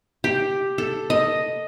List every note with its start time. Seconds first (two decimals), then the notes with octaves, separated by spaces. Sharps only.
0.24 G4
0.78 A4
1.10 D#5